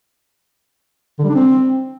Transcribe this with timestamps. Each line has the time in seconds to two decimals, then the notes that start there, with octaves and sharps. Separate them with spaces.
1.19 D3
1.24 G3
1.29 D4
1.35 C4